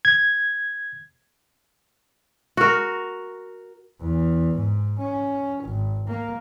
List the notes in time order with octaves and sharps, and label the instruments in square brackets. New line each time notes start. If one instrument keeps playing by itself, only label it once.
[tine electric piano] G#6
[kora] F#4 A#4
[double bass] E2
G#2
C#4
G#1
A#3